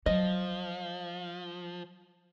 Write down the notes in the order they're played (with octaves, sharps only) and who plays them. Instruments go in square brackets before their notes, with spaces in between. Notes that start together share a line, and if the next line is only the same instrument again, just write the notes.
[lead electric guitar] F3 [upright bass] F#3 [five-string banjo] D#5